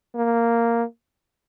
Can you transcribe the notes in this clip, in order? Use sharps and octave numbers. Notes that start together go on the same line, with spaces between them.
A#3